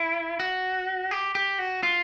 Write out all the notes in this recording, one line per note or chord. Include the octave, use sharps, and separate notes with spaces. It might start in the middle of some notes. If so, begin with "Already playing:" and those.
Already playing: E4
F#4
G4
G4
F#4
F4